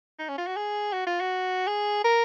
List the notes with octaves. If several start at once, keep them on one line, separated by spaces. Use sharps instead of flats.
D#4
C#4
F4
F#4
G#4
F#4
F4
F#4
G#4
A#4